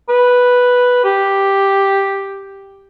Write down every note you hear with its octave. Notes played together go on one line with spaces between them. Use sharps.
B4
G4